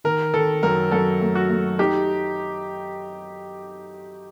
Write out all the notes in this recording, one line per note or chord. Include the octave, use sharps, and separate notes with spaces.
D#3 A#4
D#3 A4
F#2 A#4
F#2 A4
A3
F#4
A3
D#4 G4